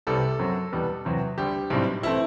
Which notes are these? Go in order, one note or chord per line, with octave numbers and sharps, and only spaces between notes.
C2 C3 G3 B3 A4
F#2 F#3 C4
E2 B2 G3 B3
E2 C3 F#3 C4
D2 D3 G3 G4
B1 A2 G3 C4
E3 A3 C4 E4